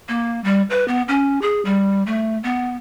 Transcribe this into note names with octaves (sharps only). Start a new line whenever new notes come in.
A#3
G3
B4
B3
C#4
G#4
G3
A3
B3